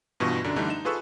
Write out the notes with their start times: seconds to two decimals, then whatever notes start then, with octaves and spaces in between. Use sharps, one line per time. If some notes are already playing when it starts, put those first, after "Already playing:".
0.20 G2 B2 E3 F4 C#6
0.44 F#2 D3 D4
0.56 D3 E3 G3 A3 D4 D#4
0.69 D#4 E7
0.85 F4 G#4 A4 B4 C#6 E6